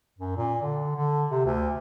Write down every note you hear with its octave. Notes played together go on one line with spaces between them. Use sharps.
F#2
A#2
D3
D3
C3
D2